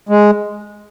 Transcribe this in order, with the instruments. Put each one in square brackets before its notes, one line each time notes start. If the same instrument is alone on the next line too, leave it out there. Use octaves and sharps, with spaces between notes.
[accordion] G#3